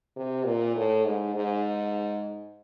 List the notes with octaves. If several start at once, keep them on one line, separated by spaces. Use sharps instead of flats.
C3
A#2
A2
G#2
G#2